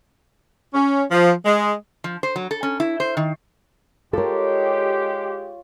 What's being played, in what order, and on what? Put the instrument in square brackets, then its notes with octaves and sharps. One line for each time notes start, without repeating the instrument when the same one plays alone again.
[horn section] C#4
F3
G#3
[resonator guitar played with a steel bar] F3
C5
F#3
A4
C#4
E4
C5
D#3
[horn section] G#3 G4 [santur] F4 C#5 [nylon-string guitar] A4 A#4